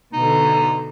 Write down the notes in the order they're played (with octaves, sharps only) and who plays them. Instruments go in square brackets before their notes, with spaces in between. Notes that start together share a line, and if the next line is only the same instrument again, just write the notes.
[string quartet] B2 D3 [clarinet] D#4